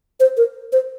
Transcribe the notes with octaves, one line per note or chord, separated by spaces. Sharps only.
C5
A#4
C5